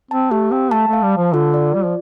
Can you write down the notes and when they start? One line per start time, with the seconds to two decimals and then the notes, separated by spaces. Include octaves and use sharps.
0.11 C4 A5
0.31 A3 G4
0.51 C4 F5
0.71 A3 A5
0.88 A3
0.93 F5
1.03 G3
1.13 F3 A5
1.34 D3 F4
1.54 D5
1.74 G3 F4
1.85 F3